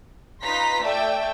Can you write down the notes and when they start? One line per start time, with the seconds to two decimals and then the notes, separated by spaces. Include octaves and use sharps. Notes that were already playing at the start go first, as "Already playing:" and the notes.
0.41 D#4 F4 B4 A#5 C6 B6
0.82 A3 D5 E5 G5